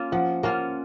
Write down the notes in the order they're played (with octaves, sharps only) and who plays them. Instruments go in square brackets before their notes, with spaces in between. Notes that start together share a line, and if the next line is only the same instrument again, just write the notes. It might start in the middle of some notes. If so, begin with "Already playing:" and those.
Already playing: [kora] A#3 C#4 F4
[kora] F3 [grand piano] F#5
[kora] A#3 C#4 F4 [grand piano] F#5